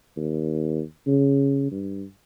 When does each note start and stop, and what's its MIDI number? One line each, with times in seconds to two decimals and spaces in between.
0.17 0.81 39
1.07 1.68 49
1.71 2.04 43